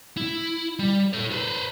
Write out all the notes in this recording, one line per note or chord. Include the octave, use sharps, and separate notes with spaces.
E4
G3
A4 C#5
B4 C5